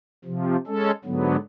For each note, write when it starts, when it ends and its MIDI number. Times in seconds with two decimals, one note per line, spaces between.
0.25 0.56 48
0.25 0.56 53
0.67 0.91 56
0.67 0.91 61
0.67 0.91 69
1.05 1.36 44
1.05 1.36 50
1.05 1.36 54
1.05 1.36 59